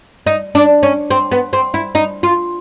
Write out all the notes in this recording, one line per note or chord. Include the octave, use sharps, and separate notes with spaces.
D#4
D4
C#4
C4
B3
C4
E4
D#4
F4